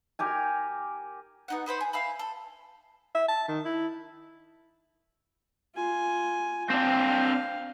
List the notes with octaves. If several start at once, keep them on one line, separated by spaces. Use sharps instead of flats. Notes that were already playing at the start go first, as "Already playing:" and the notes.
G4 A#4 G#5
B3 D#4 F#5
D#4 B4 C5 B5
G#4
E5 F5 G#5 B5
A4
E5
A5
D#3
E4
F4 G#5
C4 D4 F5